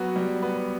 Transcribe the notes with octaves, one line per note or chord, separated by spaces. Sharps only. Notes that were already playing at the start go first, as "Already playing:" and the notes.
Already playing: F#3 B3 F#4
G3
B3